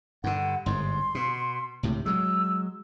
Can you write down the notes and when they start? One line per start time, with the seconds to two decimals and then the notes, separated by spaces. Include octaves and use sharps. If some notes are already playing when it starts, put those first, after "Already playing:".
0.24 G2 D3 F#5
0.66 G1 G#2 C6
1.15 B2
1.83 C#2 A2 C3
2.06 F#3 G#3 E6